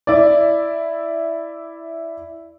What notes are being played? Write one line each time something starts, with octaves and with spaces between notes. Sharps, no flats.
E4 D5